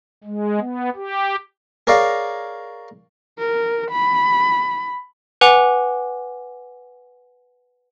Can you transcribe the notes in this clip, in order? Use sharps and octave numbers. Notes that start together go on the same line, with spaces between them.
G#3
B3
G4
G#4 A#4 C#5 D5 F5
A#4
B5
B4 F#5 G#5 D6 F7